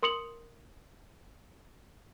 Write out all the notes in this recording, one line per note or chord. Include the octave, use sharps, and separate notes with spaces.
A#4 C6 D#6 C#7 F7 F#7